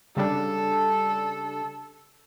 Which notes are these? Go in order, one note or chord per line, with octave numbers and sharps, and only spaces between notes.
C#3 G3 D4 A4